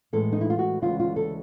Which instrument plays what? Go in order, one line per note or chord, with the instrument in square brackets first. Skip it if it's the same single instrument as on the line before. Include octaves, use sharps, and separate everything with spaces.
[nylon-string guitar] A2 E3 G#3 A4
D#4
E4
F4
F#4
D2 C#3 E3 G#3 F4
F4
A4